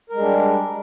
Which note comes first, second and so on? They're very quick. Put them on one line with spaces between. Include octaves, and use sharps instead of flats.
A#4 G#3 G3 D4